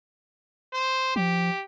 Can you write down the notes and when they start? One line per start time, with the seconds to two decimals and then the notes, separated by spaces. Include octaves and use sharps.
0.73 C5
1.16 F3 G4